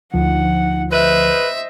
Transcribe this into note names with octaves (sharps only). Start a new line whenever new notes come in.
D2 F3 D#4 F#5
B4 C5 D#5 E5